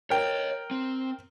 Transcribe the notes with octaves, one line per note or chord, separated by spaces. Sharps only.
A#4 C#5 D#5 G5
C4